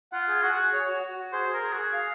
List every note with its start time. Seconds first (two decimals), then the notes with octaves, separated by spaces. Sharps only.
0.12 F4 F#5
0.28 G#4
0.42 F#4 F#5
0.58 G#4
0.73 C#5
0.88 F#4
1.02 F#4
1.19 F#4
1.33 G#4 C5
1.49 G#4
1.53 A#4
1.62 G#4
1.73 F#4 G#4
1.93 F5